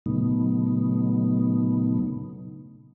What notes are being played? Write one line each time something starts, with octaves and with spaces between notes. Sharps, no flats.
A#2 C#3 F#3 A3 B3 D#4